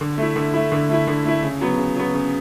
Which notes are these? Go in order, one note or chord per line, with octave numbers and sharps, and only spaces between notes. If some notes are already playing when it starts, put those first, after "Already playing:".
D3
A3 E4
D3
A3 E4
D3
A3 E4
D3
A3 E4
C#3
F#3 B3
C#3
F#3 B3
C#3